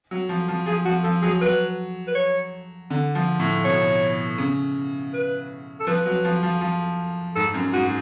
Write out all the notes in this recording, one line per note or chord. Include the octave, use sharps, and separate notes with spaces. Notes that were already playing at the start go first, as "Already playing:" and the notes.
F#3
F3
F3
F3 G#4
F3 F#4
F3 A4
F#3 G#4
F#3 B4
B4
C#5
D3
F3
A2
B2 C#5
C#3
B4
A4
F3 B4
F#3
F3
F3
F3
G#2 A4
F#2
G#2 F#4